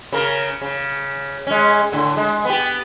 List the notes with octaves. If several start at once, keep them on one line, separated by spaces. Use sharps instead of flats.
C#3 A#4
C#3
G#3 C#4
A2 D3
G#3
B3 G4